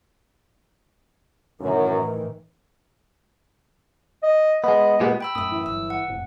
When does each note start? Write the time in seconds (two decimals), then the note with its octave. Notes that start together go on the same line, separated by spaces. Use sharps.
1.61 F#2 A2 D#3 E3
4.23 D#5
4.64 G#3 B3 D#5
5.00 A#2 G#3 B3 G4
5.21 G5 B5 E6
5.35 F#2 A2 D#6 E6
5.52 E3
5.66 G1 F#3 E6
5.90 F#5
6.08 E1 F2 A2